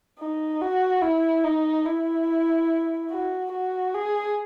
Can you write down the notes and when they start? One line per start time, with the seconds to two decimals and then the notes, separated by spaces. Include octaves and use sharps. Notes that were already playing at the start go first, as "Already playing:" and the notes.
0.19 D#4
0.61 F#4
1.02 E4
1.43 D#4
1.86 E4
3.10 F#4
3.52 F#4
3.94 G#4